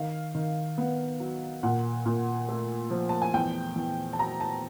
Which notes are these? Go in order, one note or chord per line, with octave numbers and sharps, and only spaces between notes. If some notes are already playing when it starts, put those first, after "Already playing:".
Already playing: D#3 F5
D#3
B3
F#3
A#2 F#5
A#2
A3
F3
A5
G#5
E2 G5
E2
A5
F#3 A#5
A5